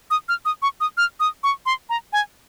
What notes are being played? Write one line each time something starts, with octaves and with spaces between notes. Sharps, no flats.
D#6
F6
D#6
C#6
D#6
F6
D#6
C#6
C6
A#5
G#5